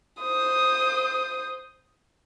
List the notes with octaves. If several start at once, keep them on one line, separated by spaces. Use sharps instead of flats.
C5 D#6